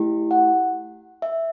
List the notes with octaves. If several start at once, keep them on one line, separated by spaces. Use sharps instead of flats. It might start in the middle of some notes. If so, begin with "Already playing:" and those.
Already playing: A3 E4 G4
F#5
E5